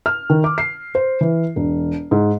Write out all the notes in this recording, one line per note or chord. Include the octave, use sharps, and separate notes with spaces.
F6
D#3
D6
C7
C5
E3
E1
G#2